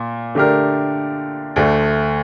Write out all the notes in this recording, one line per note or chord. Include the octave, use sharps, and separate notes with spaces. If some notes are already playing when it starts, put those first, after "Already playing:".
Already playing: A#2
D3 A3 D4 G4 A#4
D2 D3 A3